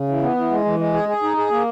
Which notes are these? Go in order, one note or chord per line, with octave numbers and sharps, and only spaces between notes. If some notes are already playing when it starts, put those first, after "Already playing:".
Already playing: C#3
E3
B3
E3
G#3
E3
G#3
G#4
G#4
D#4
G#4
A#3